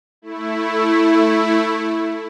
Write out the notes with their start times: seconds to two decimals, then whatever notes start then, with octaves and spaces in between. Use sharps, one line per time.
0.22 A3 E4